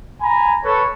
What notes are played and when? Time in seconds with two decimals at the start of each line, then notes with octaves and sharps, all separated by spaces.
0.21 G#5 A#5 B5
0.64 A4 B4 C#5